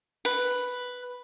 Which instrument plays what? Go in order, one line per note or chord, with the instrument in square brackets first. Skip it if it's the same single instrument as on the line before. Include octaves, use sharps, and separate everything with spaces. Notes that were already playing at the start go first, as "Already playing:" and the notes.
[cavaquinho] B4